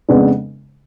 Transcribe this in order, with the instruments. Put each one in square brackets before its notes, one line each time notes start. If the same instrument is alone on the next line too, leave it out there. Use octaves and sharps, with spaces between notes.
[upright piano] F2 C#3 G#3 B3 D4